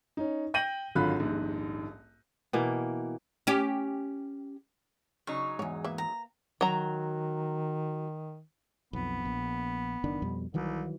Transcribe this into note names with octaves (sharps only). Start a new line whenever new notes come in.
C#4 D#4
G5 G6 A#6 D#7 F#7
G#1 D3 F#3 F4 B5 F#6
D#1 A#1 G#2
B2 E3 A#3
C#4 G4
C#3 F#3 D#4 C#6
E2 G#2 C#5
A#3 B4 E5
A#5
D#3 F#3 A#5
B1 F2 B3
A#1
F#1 D#3 D4
F2 B2 G3
C2 D#3 E3 F#3